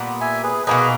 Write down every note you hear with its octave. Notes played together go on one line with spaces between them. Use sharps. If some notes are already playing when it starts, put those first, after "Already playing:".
Already playing: A#2 G3 B3
E5 G#5
G#4 B4
B2 A#3 D#4 G#4 B4